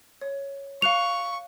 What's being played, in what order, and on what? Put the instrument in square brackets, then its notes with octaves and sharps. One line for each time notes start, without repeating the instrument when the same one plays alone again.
[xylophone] C#5
[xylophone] F5 F#6 C#7 [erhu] C#6 [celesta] F7